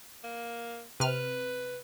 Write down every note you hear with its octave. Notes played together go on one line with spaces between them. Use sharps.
A#3
C3 B4 F6